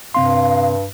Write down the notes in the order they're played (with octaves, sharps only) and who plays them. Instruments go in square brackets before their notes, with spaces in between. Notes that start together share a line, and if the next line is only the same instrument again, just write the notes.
[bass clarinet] G2 [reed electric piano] C3 C4 C6 [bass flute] F5